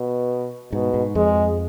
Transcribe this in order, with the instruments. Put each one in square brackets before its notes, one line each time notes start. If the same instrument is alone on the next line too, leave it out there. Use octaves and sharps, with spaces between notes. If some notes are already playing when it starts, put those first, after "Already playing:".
Already playing: [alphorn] B2
[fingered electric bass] G#2 [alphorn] B2
[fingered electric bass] G#2
[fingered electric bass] F2 [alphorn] G#3